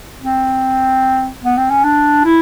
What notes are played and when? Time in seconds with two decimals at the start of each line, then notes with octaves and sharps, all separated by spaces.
0.23 C4
1.44 B3
1.57 C4
1.71 C#4
1.84 D4
2.24 E4